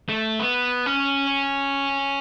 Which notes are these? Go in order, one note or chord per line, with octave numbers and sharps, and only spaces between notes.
A3
B3
C#4